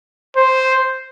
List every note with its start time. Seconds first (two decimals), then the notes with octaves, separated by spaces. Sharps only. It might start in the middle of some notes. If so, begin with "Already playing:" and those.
0.37 C5